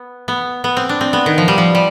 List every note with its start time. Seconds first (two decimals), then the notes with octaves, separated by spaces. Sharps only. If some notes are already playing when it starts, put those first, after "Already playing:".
Already playing: B3
0.28 B3
0.64 B3
0.77 C4
0.89 D4
1.01 C4
1.13 B3
1.26 D#3
1.38 F3
1.48 G3
1.58 F3
1.75 G3